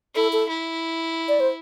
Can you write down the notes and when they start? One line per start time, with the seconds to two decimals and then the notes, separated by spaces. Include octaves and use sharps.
0.15 E4 A4
0.33 A4
0.49 E4
1.29 D5
1.40 C5